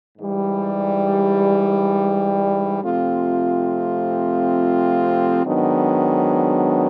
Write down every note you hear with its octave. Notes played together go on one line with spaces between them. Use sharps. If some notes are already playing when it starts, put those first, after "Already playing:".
G#2 E3 G3
C3 F3 A3 C4 F4
G#2 D#3 F#3 B3 D4